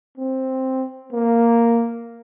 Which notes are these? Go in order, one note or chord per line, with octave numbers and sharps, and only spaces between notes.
C4
A#3